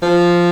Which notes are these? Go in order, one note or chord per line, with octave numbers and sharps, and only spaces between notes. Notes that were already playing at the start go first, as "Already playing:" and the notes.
F3